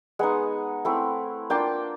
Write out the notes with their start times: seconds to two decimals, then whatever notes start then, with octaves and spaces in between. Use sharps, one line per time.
0.19 G#3 B3 D#4 F#5 G#5
0.85 A3 C4 E4
1.50 A#3 D4 F4 G5 A5